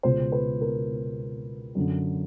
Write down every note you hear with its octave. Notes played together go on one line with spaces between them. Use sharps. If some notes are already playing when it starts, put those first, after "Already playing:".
C#2 B2 C5
B4
A#4
F#2 D3